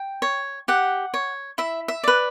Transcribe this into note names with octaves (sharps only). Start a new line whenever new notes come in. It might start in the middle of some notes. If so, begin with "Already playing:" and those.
Already playing: G5
C#5
G4 F#5
C#5
E4 E5
E5
B4 D5